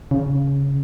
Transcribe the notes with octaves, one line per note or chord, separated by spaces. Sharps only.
C#3